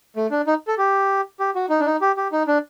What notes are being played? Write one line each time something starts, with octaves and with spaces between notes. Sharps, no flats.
A3
D4
D#4
A4
G4
G4
F#4
D#4
D4
D#4
G4
G4
D#4
D4